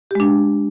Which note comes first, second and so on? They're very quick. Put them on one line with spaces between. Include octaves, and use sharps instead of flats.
G4 G#3 D4